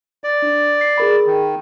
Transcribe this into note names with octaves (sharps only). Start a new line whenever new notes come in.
D5
D4
C7
G#4 A#4 B5
D#3